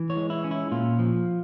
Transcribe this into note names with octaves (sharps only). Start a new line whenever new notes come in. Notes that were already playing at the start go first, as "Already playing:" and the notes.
Already playing: E3
C#5
G#3
E4
C#4
E4
A#2 F4
F3